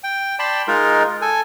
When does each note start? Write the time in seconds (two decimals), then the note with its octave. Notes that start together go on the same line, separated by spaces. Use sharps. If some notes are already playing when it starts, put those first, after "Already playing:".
0.04 G5
0.39 D5 G5 A5 B5 C6
0.68 G#3 D#4 F4 A#4
1.22 A4 G#5